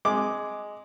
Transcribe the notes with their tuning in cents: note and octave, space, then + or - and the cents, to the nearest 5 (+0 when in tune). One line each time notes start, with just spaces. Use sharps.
G#3 +0 D6 +0